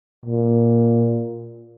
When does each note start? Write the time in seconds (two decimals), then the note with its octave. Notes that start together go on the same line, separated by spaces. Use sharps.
0.26 A#2